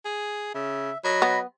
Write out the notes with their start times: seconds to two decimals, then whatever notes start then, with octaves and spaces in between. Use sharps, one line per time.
0.05 G#4
0.54 C#3 E5
1.04 F#3 D#5 B5
1.22 B3